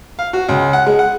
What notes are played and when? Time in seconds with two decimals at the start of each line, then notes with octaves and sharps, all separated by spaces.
0.19 F5
0.33 F#4
0.49 C#2
0.73 F#5
0.86 G#3
0.99 F#5